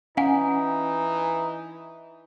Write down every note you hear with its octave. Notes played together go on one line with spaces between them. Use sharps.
E3 C#4 D#4 F5 F#5 G#5